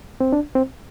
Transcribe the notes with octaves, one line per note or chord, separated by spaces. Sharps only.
C4
D4
C4